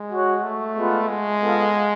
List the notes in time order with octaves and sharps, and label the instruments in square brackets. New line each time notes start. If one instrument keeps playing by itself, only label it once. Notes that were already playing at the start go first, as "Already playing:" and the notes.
Already playing: [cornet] G#3
[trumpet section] F#4 C#5 F#5
[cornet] A3
[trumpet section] G#3 B3 F4
[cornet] G#3
[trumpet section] B3 F4 A4 F5